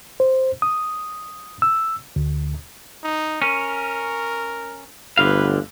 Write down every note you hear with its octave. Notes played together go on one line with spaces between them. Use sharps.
C5
D#6
E6
D2
D#4
C#4 A#4
G1 D2 D3 B4 F5